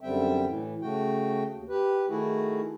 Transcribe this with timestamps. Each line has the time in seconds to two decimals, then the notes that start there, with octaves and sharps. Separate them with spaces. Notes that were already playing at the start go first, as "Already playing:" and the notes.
0.01 F#2 D3 G3 C4 E5 G5
0.46 A2 E3
0.81 C#3 A3 F#4 G5
1.53 D#2
1.69 G4 B4
2.09 D#3 A3 E4 F#4 G#4